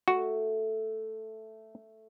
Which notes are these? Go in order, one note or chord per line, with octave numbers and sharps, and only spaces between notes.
A3 F#4